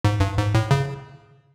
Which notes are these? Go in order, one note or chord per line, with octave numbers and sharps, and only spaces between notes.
G#2
G2
G#2
A2
C#3